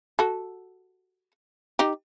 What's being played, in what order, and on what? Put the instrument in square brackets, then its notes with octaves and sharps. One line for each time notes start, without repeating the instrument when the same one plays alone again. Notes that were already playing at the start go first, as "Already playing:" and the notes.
[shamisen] F#4 A4
D#4 G4